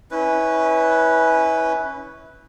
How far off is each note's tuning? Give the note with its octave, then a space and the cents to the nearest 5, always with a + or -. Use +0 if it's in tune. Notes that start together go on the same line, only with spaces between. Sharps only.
C#4 +0 E4 -30 B4 +0